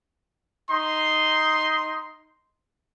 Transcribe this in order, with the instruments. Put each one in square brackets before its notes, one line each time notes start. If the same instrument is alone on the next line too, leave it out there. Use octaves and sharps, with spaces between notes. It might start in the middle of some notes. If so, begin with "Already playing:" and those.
[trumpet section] D#4 C6